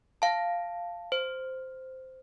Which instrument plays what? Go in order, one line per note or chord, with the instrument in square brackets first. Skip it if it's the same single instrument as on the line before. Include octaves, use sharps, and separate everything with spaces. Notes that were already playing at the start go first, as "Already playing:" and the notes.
[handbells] F5 A5
C5